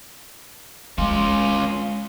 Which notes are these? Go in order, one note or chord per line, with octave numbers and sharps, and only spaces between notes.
G#3 C#4 F4